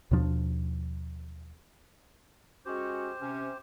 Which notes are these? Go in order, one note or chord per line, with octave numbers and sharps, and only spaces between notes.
D#2 B2 F3 D4
G#3 C#4 F#4 G4 C5
C3 C#4